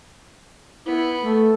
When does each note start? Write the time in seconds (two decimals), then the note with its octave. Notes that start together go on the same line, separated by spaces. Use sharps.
0.86 B3 E4
1.23 A3 A4